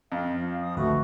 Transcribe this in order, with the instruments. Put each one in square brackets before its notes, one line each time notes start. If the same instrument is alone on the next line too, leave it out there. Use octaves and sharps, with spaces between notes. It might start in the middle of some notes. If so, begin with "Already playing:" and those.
[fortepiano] F2 [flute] F5
[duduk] F3
[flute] D#6
[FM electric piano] G#1 D2 B4 [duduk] A3 [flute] F#4